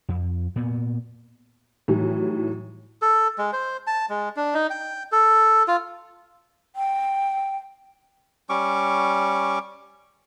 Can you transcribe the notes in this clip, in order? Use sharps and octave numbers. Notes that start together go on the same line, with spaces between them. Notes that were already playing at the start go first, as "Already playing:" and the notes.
F2
A#2 B3
A2 D#3 E3 F#3 G3
A4
G#3
C5
A5
G#3
D4
D#4
G5
A4
F4
G5
G3 C#4 C#6 D6